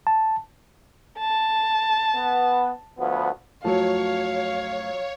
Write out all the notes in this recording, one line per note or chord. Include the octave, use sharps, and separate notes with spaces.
A5
A5
B3
D2 F3 B3
F#2 F3 F#3 A3 C#5 F5 A5